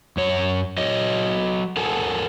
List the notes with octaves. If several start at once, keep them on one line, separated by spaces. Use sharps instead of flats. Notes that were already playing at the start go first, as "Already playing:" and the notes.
F#2 C#5
F#3 C#5 D#5
A4 A#4 F#5 G#5 A5